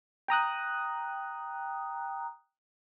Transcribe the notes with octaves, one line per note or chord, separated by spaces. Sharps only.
G5 A#5 D#6 F#6